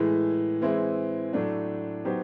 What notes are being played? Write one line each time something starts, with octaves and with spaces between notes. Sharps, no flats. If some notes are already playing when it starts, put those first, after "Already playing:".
Already playing: A2 E3 G#3
E3 G#3 C4 E4
A2 F#3 A3 D4
F#3 B3 D#4 G4 C5